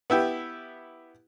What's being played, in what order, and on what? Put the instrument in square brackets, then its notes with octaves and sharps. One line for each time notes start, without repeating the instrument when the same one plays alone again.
[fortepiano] B3 E4 G4